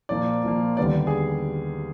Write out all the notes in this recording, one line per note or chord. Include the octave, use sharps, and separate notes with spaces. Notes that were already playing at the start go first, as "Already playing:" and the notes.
A#2 F3 A#3 D5
A#2 F3 A#3
D#2 D3 G3 B3 D5
G#4